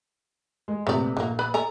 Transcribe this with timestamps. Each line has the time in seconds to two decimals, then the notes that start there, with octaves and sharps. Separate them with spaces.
0.68 G#3
0.87 A#1 C3 A3 B4 D5
1.17 A#1 D3 A#3
1.39 B4 D5 B5
1.54 A4 D5 G#5 A#5